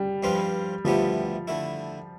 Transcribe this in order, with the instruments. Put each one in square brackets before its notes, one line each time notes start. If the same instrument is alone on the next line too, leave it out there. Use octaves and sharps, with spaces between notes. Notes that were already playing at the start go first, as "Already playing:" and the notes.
Already playing: [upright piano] G3
[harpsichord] G2 F3 C4 F4 B4
[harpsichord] D2 C3 G3 B3 E4 [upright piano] F3
[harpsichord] D3 A3 E4